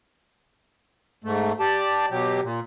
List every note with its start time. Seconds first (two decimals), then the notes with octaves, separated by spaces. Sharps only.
1.24 G#2 A3
1.60 G4 D5 A5
2.10 B2 F#3 G4
2.43 A#2